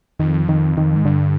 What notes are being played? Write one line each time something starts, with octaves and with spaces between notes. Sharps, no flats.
F2 D#3
D#3
D#3
G#2
G2 D3